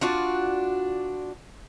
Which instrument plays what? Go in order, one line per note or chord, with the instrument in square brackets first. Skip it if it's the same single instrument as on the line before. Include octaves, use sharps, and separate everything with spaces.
[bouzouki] D4 F4 F#4 D5